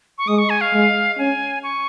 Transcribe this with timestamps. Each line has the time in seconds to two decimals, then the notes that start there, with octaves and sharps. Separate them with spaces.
0.18 C#6
0.28 G#3 D#6
0.38 C#6
0.50 G#5
0.61 F5
0.73 G#3
1.18 C#4 G#5
1.63 C#6